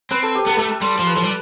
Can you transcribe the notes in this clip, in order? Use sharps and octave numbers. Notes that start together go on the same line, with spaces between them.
C4 B4
A4
G4
B3 A4
B4
A3 A4
A4
G3 C5
F3 C5
B4
F3 A4
G3